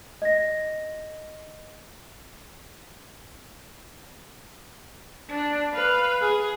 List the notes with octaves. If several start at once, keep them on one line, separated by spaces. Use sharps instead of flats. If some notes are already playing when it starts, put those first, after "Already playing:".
D#5 A#6
D4
B4 F5
G#4